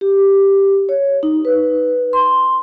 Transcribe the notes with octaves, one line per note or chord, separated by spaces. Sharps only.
G4
C#5
D#4
B4
C6